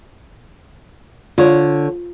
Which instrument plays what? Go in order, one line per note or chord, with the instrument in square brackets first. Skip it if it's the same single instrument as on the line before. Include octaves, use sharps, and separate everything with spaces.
[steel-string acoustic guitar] D3 C#5 [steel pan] F4